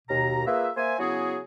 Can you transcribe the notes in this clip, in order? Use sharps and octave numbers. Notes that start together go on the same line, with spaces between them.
D#2 B2 A#5
A#3 F4 G#4 B4 E5
A#3 C5 E5 G#5
C#3 F#3 B3 E4 F#4 G#4